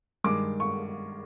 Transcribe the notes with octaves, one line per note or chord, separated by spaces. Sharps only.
G2 D#3 G#3 D6
C#6